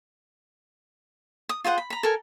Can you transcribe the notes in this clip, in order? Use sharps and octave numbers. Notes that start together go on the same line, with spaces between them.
D#6
F4 G#4 C5 F#5
B5
A#5 B5
A4 A#4 G#5